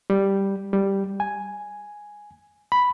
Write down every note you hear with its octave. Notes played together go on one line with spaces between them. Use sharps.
G3
G3
G#5
B5